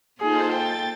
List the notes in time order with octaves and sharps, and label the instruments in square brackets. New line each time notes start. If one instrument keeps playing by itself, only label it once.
[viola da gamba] A#3 A4 [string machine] D#4 F4 C5 [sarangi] G#4
[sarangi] G5 [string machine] A6